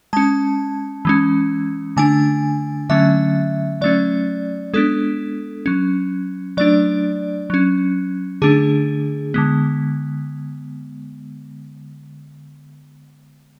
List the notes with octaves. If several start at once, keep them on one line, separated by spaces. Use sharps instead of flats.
G#3 C#4 A5
E3 G#3 C#4
D3 A3 D4 G#5
D3 F#3 A3 C#4 E5
F#3 A3 C#4 D5
G#3 B3 D4 A4
F#3 C#4
F#3 A3 D4 D5
F#3 C#4
D3 A3 D4 G#4
D3 G#3 B3